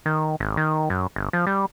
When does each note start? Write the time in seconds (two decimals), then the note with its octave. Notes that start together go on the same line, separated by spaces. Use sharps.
0.06 D#3
0.40 G#1
0.57 D#3
0.90 F#2
1.16 G1
1.33 F3
1.47 G3